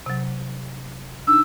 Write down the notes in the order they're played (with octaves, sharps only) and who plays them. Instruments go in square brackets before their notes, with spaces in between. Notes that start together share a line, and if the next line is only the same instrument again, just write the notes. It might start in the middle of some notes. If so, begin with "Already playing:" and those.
[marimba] C3 F#3
[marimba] D4 D#4 [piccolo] E6